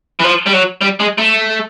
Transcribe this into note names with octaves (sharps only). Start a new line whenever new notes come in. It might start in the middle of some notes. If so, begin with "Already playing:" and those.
E3
F3
G3
F#3
G3
G#3
A3